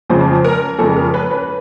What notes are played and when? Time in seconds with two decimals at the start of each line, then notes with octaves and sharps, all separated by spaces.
0.10 F2 C#3 F3 G#3 C5
0.45 A#4
0.79 F2 C#3 F3 G#3 A4
0.96 A#4
1.14 B4
1.31 B4